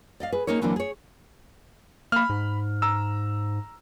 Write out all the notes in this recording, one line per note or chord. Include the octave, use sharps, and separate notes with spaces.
D5 D#5 F5
G#4 B4
A#3 C#4 D#4 A#4 C#5
D3 E3 F#3 A#3 C4 D4
G#4 C#5
A#3 B5 F6
G#2
A#5 E6